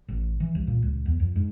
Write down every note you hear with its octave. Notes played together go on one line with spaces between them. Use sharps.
A1
E3
C2
A#2
C#2
E2
F2
G#2